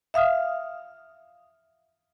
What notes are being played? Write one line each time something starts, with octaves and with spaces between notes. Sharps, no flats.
E5 F5 D#6 F6